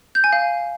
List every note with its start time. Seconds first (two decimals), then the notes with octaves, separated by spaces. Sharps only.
0.15 G6
0.24 G#5
0.33 F5